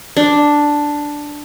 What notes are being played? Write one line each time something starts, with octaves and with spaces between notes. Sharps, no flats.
D4